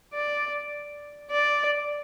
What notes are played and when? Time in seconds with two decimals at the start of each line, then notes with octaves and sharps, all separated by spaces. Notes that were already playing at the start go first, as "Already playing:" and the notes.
0.14 D5
1.31 D5